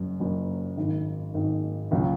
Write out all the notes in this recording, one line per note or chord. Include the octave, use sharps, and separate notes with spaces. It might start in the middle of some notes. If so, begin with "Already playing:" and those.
Already playing: F#1 F#2 F#3
F#1 F#2 F#3
G#1 G#2 D#3
G#1 G#2 D#3
C#2 C#3 F#3